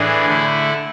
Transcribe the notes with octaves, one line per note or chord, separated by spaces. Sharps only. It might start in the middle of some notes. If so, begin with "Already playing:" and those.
Already playing: A2 E3 D4 G#4
D3 A3 E4